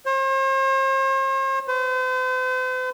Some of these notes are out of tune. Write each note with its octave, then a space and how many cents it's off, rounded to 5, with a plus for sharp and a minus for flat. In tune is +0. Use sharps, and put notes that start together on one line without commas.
C5 +45
C5 -40